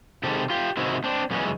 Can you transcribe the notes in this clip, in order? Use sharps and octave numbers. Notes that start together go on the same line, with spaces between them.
C3 D#3 G#3 G4 A4
F4 G4
C3 D#3 G#3 E4 F#4
C4 D4
F#2 C#3 E3 G#3 B3 C#4